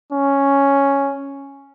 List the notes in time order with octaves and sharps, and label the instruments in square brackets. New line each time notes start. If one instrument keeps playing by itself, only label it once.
[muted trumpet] C#4